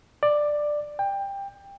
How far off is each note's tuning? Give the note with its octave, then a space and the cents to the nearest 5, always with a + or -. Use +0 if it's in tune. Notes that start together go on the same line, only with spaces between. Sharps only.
D5 +10
G5 +20